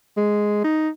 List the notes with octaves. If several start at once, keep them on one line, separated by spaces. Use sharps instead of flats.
G#3
D#4